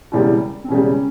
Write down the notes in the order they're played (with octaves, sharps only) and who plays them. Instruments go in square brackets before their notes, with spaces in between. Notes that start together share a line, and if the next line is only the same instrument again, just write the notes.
[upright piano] E1 E2 C#3 G3 [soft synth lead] E4
[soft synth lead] C4
[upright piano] E1 E2 C#3 G3 [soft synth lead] C#4